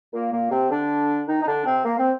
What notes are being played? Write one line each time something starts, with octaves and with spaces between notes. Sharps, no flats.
A#2 A#3
A#2 A#3
C3 C4
D3 D4
D#3 D#4
D#4
D3 D4
C3 C4
A#3
C4